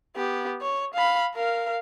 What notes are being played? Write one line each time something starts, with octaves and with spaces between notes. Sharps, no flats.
B3 G4
C#5
F5 B5
A#4 F5